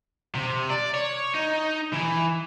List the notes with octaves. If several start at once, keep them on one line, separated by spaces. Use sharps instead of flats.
C3
D5
C#5
D#4
E3